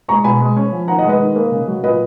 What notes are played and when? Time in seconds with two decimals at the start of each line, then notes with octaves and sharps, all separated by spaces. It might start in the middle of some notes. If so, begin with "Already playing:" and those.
0.08 G#3 A#5 C#6
0.24 B2 G#5 B5
0.41 G#3
0.57 C#4
0.72 F3
0.88 D#3 F#5 A#5
0.99 D#5 F#5
1.04 G#3
1.09 B4 D#5
1.20 D#3
1.36 A#3
1.52 C#3
1.68 F#3
1.84 A#2 B4 D#5